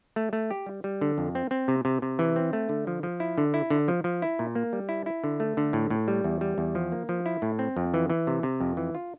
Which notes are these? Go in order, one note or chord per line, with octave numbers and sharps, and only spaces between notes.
A3
A3
G4
G3
G3
D3
F2
C4
C4
C3
C3
C3
E3
C4
A3
D3
F3
F3
E4
D3
E4
D3
F3
F3
E4
A#2
A#3
G3
E4
E4
D3
A3
D3
A2
A2
G3
E2
G3
E2
F3
A#3
F3
E4
A2
C4
F2
E3
E3
C3
C3
F2
E3
F4